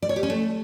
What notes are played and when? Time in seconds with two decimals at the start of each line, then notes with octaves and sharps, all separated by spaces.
0.02 D5
0.09 C#5
0.16 G4
0.23 C#4
0.30 A3